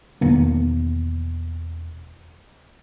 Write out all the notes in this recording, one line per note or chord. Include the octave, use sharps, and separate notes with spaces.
E1 D#3 A#3 B3